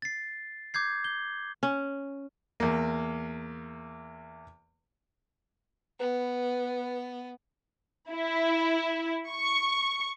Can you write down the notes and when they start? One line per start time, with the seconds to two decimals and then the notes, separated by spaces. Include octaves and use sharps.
0.02 A6 C7
0.74 D6 G6 G#6 C7
1.04 G6 G7
1.63 C#4
2.60 E2 A#3
6.00 B3 B4
8.11 E4
9.30 C#6